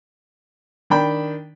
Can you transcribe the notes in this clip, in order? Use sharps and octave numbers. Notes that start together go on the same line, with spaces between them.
D#3 D4 G5 B5